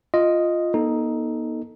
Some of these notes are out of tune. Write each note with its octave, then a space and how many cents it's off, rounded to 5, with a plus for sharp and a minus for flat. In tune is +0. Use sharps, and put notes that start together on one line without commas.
F4 +0 D#5 +0
B3 -45 D#4 +5 A4 +0